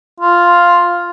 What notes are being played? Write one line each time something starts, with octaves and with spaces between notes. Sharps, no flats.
F4